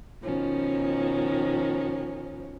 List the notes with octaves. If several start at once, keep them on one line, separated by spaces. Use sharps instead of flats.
B2 D#3 F3 C#4